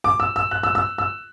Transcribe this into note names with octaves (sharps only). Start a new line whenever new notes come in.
D6
E6
E6
F#6
E6
E6
E6